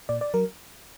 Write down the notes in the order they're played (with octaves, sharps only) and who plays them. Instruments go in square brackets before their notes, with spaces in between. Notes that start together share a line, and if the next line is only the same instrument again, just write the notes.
[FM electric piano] A#2 D5
D5
F#3 A#4